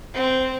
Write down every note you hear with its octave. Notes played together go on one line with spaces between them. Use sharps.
C4